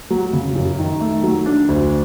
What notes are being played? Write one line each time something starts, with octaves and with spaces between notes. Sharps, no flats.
F#3
C#3
F#2
D#3
A3
F#3
D4
D2